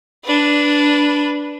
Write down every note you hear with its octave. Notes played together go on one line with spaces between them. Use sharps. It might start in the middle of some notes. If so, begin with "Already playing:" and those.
D4 B4